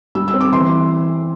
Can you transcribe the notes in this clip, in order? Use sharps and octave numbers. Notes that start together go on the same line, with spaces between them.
G3 E6
E6
C4
D6
E3 C6